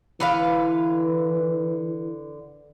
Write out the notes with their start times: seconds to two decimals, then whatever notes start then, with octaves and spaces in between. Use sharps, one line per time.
0.20 D3 E3 B4 F5